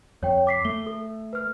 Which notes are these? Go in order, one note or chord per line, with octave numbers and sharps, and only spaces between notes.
F2 C#5 G5
D6 B6 C7
A3 G7
A4
B4 F6